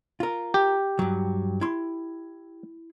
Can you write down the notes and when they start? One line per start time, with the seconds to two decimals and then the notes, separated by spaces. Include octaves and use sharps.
0.20 F4 A#4
0.54 G4
0.99 G2 F#3
1.61 E4 C6